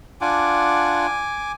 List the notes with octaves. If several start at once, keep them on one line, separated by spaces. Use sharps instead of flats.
D4 F4 F#5 G#5 D6